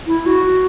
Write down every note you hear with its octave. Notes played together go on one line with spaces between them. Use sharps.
E4
F#4